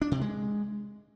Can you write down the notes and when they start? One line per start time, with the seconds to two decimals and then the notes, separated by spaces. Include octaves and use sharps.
0.02 D4
0.12 C3
0.21 G#3